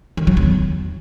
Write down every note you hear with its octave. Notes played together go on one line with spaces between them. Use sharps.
D#3
F#3
E2